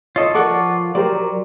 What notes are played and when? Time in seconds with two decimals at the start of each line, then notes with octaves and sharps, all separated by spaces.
0.16 F4 A4 C#5 D#5
0.35 F3 F4 A4 A#4 D5 F#5 C#6 D6
0.95 F#3 G4 A#4 C5 D5